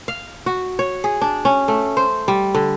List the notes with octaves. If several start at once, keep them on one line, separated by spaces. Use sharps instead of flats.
F5
F#4
C#5
G#4
D4
C#4
A3
C5
G3
D3